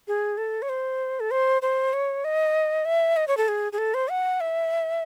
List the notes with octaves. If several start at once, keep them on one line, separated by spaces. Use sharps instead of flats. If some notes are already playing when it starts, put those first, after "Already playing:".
G#4
A4
C#5
C5
A4
C5
C5
C#5
D#5
E5
D#5
C#5
A4
G#4
G#4
A4
C5
F#5
E5